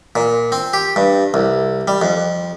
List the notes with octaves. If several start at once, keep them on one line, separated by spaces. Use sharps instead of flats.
A#2
C4
G4
G2
C2
G3
F2